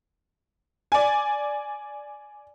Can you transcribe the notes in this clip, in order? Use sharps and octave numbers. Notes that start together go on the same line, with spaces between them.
D5 G#5